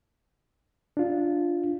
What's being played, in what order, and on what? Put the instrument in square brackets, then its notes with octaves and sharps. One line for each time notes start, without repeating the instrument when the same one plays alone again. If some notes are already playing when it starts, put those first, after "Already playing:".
[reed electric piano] D4 F4